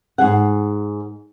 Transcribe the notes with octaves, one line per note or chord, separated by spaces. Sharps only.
G#2 G#4 F#5